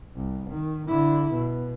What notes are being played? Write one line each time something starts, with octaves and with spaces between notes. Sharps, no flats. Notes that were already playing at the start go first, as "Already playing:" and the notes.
C2
D#3
D3 E4
B2